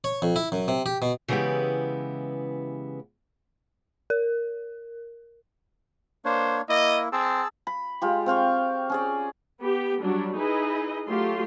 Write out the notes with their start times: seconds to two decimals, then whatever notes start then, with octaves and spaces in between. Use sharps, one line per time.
0.04 C#5
0.22 F2
0.36 E4
0.52 F#2
0.68 C3
0.86 G4
1.02 B2
1.28 C#3 E3 G#3 B3 E4 G4
4.10 A#4
6.25 A#3 D4 C5 C#5
6.69 A#3 E4 D#5
7.12 C4 G#4 A5 E6
7.67 B5
8.02 G#3 F4 G4
8.26 C4 F5 G5 C#6
8.90 C#4 G#4 D5
9.62 B3 G4
10.01 F#3 G3 D4
10.36 D#4 E4 G#4 B4 D#5
11.07 F#3 A3 F4 G4 C6